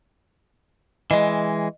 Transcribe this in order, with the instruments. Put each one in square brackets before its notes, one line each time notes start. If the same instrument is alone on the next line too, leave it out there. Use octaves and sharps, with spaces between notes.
[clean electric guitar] E3 G#3 [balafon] D#5